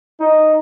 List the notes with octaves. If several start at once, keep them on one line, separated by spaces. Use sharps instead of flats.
D#4